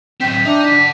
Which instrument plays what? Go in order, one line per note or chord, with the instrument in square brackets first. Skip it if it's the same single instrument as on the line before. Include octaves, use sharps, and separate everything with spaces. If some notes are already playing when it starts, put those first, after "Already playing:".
[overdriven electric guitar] F#3 C4 [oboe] G5 [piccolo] B6
[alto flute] D4 [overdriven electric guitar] D#4 [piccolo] E5
[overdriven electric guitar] F#5 A5 [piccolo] B6